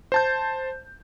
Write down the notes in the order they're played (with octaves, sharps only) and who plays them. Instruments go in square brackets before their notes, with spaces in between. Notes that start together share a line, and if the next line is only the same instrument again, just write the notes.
[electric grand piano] C5 A5 G6